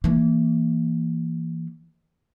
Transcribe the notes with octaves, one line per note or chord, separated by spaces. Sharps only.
E3 A#3